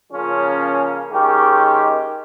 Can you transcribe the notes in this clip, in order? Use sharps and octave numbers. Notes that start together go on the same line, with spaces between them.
C#3 F3 A#3 C#4 F4
D#3 G#3 C#4 G4